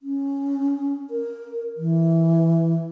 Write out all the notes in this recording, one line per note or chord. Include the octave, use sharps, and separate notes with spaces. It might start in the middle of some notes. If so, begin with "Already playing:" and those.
C#4
A#4
E3